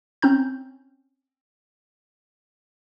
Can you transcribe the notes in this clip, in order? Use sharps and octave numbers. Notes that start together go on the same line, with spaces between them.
C4 C#4 A#5 G6